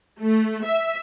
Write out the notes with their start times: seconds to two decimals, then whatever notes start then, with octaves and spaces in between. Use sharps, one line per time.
0.19 A3
0.65 E5